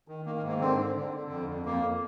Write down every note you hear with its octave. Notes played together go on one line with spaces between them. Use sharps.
D#3
D#3 A#3
A#3
G#2
A#3
D3 C4
D3
D3
D3
F2
F2
F2 A#3